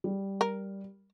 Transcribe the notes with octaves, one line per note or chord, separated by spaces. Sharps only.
G3
A#4